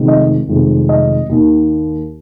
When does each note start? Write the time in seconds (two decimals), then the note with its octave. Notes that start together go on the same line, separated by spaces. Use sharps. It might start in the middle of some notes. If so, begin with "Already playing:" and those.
Already playing: F1 F2 D#3 G#3
0.08 D#5
0.48 F1 F2 D#3 G#3
0.89 D#5
1.29 D#2 D#3 A#3